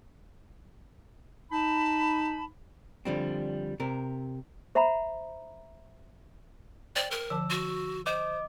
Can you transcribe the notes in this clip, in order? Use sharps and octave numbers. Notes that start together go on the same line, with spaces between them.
D#4 A5 B5
D3 F3 G3 C4
C3 A#4
C5 E5 F#5 A#5 B5
C5 D5 G5
A#4
D3 F3 A5 E6
F#4
C5 D#5 D6